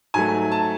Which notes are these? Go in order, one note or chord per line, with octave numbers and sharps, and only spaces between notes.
G#2 F#3 A3 G#5
A5